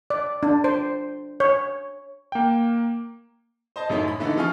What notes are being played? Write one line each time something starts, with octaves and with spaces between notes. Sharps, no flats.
D5
D4
C5
C#5
A#3 G5
C5 D#5 A5
A1 F#2 A3 D#4 E4 C#5
B5
D3 E3 A3 B3 D#4 A4
F3 F4 G#5 C#6 F6